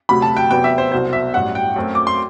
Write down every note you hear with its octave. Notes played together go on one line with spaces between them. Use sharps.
D2 C3 F#3 B5
A5
G5
E2 C3 F#3 B3 G5
E5
C5
C2 B2 F#3 C5
E5
A1 G2 F#3 F#5
G5
F#2 F#3 A3 C4
D6
C6